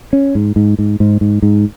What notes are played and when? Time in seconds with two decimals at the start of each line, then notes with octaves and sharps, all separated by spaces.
0.13 C#4
0.35 G#2
0.56 G#2
0.79 G#2
1.00 G#2
1.21 G#2
1.42 G#2